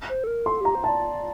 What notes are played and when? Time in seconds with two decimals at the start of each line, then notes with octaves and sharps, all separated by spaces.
0.09 C5
0.24 A4
0.27 A#4
0.46 A4 C6
0.61 G4 A#5
0.75 C5
0.84 E5 A5
0.88 D5